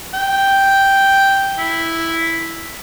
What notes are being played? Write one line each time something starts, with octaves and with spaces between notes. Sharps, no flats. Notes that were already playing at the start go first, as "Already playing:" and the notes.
G5
E4